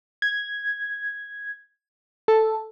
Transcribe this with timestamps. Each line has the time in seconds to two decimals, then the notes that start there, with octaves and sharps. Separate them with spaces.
0.22 G#6
2.28 A4